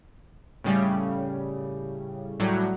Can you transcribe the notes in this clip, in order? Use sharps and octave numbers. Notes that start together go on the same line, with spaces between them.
A2 C#3 G3
A2 F#3 G3